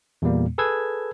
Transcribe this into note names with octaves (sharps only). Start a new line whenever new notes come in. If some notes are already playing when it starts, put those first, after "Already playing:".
E2 A#2 G3 A#3
G#4 A4 B4 E6 G#6